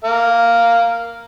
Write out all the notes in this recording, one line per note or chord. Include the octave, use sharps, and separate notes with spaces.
A#4 F5